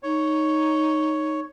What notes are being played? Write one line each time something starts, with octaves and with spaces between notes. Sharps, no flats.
D#4 C#5